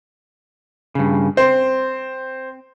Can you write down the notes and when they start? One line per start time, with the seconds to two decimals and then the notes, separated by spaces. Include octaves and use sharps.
0.95 G2 C#3
1.37 C4 C5